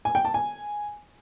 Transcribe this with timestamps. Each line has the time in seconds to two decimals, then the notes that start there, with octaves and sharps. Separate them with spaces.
0.05 G#5
0.15 G5
0.25 A5
0.34 G#5